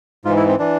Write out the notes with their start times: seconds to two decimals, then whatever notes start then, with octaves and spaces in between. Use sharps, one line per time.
0.25 G#2 F4
0.29 E3
0.37 E4
0.48 C4
0.59 E3 D4